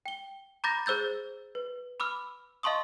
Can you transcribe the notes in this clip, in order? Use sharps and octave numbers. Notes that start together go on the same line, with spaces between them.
G5 G7
A#5 B5 D6 G6 A6 A#6
G#4 C5 E6 G6 A6
B4
B5 D6 E6 F6
D#5 F5 A5 C6 C#6 D#6